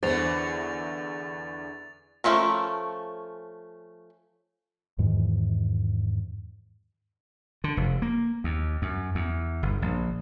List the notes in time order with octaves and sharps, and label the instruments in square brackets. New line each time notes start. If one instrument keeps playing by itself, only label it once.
[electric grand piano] E2 [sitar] D3 E3 [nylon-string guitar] C5 [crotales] A6 F7
[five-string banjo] F3 F#3 A3 C#4 A#4
[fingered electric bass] E2 G#2 D#3 E3
[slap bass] D3
F1
A#3
D#2
F#2
E2
G1
A#1